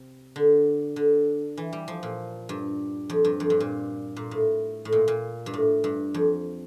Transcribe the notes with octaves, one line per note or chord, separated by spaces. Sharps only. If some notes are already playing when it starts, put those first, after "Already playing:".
Already playing: C3
D3
D3
E3
G3
F3
A#2
G2
F2
G2
F2
G2
A#2
A#2
A2
A2
A#2
A#2
G2
A2
G2
F2